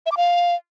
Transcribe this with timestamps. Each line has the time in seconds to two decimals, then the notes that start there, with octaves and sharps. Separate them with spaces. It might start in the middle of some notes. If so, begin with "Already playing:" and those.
0.06 E5
0.12 D6
0.17 F5